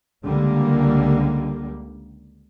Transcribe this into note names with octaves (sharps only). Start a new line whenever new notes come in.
C#2 D3 G3 A#3